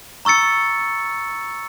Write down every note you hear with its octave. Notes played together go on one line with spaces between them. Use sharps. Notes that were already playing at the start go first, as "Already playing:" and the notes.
A#5 C#6 E6 A6 C#7